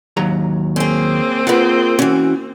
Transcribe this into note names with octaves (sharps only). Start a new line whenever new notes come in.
D#2 F#3 A#5
A#3 C4 C#4 G#4
F4 G#4 A#4 B4 F#5
E3 C#4 F#4